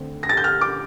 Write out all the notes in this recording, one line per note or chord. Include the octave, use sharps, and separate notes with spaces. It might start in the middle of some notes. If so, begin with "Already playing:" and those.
Already playing: D3 A3 C4
A#6
A6
G6
F6
D6